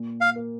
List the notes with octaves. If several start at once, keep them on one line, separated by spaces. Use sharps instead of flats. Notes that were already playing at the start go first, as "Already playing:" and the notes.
Already playing: A#2
F5
A#3